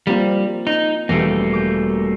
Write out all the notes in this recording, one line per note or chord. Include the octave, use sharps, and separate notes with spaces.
G3 A#3 C4 F4
D#4
E1 G3 A3 A#3
D6 G6